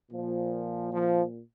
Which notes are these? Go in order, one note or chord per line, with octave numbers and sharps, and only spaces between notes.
A#2 F3
F3